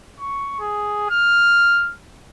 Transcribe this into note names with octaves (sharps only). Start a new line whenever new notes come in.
C#6
G#4
F6